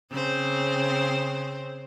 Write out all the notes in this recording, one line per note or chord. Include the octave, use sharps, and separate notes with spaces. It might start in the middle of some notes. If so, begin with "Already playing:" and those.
C#3 C4 C5